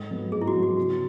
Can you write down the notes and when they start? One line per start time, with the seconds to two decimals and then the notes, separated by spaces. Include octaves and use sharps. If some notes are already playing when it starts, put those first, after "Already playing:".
Already playing: G#2 A4
0.11 F#3 B3
0.32 G#2 G#4
0.42 E4
0.47 F#4
0.55 F#3 B3
0.63 F#4
0.77 C#3 F#4